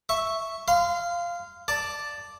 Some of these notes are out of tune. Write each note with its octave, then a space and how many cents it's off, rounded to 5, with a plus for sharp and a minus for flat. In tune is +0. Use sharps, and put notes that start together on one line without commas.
E5 +0 C#6 -5
F5 -10 C6 -30
D5 +0 A5 +0